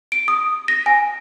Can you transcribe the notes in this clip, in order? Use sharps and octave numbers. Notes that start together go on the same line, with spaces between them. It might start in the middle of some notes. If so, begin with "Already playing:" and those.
D7
D#6
A#6
G#5